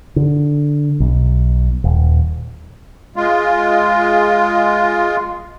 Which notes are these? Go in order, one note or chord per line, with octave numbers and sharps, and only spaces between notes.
D3
B1
D#1
G#3 F4